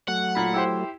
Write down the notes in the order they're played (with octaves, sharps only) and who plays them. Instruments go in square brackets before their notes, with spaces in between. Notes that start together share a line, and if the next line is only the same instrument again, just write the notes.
[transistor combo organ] F#3 A3 [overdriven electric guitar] F#5
[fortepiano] A#2 B5
E4 G4 C5